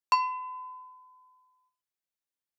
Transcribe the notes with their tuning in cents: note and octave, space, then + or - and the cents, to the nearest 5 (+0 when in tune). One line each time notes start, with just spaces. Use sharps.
B5 +45